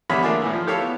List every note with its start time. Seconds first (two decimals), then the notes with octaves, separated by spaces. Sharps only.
0.10 E2 D3 G3 C#5 E5 B5
0.23 A3 A#3 D4 F4 G#4 E5
0.42 A2 E3
0.53 F3
0.67 E4 G4 A4 C#5 F5
0.81 B3